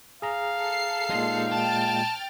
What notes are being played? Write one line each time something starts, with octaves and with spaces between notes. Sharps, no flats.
G#4 F5 A#5
A4 C7
A#2 G#3 D#4
G5 A5 F6 A6